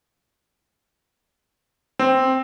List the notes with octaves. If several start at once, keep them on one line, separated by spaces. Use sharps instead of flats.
C4